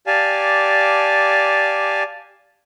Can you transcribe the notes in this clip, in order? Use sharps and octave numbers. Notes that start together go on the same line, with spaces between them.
G4 D5 F5 G#5 A5